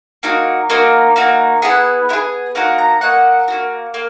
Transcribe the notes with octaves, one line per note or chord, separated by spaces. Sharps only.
A#3 D#4 F#4
A#3 D#4 F#4
A#3 D#4 F#4
B3 E4 G#4 F#5
B3 E4 G#4
A#3 D#4 F#4 F#5
A#5
A#3 D#4 F#4 F#5
A#3 D#4 F#4
A#3